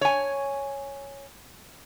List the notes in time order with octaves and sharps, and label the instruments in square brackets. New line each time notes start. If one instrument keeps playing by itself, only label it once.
[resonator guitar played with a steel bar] C#5 G#5